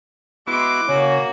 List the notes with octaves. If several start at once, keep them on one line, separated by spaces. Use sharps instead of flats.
G#3 B3 E4 F#4 C6 D6
C#3 A#3 C#4 F#4